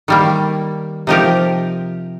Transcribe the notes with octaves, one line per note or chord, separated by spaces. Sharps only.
D#3 G3 A#3
C3 F3 D#4 G4 A#4